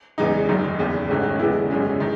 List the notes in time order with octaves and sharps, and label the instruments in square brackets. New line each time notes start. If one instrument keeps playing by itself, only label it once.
[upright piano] E2 C#3 E3 G#3 D#4
F#1 F#2 D#3 F#3
F#1 E2 C#3
A1 G#2 D#3 A3 C#4
E2 C#3 G#3 B3 E4
G#1 F#2 C#3 G#3 C#4
D#3